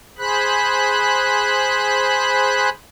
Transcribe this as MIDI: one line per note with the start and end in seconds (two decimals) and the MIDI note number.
0.18 2.69 68
0.18 2.69 72
0.18 2.69 83
0.18 2.69 90